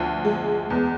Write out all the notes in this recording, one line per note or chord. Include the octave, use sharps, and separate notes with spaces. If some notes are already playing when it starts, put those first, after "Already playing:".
Already playing: D2 F3
G#3
E2